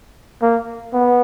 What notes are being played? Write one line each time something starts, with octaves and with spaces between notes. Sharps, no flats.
A#3
B3